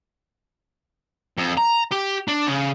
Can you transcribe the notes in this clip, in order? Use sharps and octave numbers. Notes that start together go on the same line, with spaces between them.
F2
A#5
G4
D4
C#3